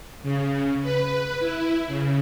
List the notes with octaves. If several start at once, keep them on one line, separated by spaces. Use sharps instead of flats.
C#3
B4
E4
C#3